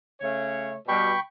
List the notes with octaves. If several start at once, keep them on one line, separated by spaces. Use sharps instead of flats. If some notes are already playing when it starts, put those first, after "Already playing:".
C#3 A3 C#5
B2 G3 G5 B5 C#6